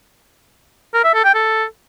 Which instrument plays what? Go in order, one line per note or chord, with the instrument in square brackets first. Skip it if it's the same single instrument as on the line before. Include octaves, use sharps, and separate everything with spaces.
[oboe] A#4
E5
A4
G5
A4